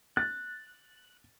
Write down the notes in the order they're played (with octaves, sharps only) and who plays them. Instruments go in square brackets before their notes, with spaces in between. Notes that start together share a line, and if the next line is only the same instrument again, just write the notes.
[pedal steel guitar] F#6 [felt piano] A6